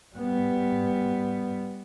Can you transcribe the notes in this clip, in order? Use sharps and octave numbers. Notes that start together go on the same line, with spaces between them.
G3 B3